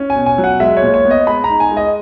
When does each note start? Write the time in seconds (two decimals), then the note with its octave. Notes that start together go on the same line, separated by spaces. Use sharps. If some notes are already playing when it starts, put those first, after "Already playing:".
Already playing: C#4
0.10 G#5
0.15 B2
0.26 G#5
0.38 F#3
0.44 F#5
0.60 G#3 E5
0.77 C#5
0.83 A#2
0.94 C#5
1.05 B3
1.11 D#5
1.27 G#3 B5
1.44 A#5
1.50 D#4
1.60 G#5
1.71 G#3
1.77 D#5